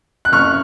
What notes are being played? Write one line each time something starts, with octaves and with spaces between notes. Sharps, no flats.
F#6
F#1 C#6 F6